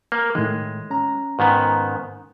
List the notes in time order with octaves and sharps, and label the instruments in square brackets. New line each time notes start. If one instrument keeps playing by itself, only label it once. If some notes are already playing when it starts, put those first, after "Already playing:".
[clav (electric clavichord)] A#3
[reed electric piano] A2 D#3 [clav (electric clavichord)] G#3
[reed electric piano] C#4 A#5
[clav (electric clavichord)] G#2 D#3 B3